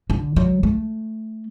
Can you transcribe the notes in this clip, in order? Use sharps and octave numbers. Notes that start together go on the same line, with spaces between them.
D3
F#3
A3